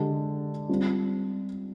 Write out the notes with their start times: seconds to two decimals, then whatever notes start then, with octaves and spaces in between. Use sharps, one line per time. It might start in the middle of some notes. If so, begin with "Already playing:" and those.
Already playing: D3 G#3 D4 G4
0.69 G3 C4 F4